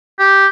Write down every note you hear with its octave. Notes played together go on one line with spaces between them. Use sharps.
G4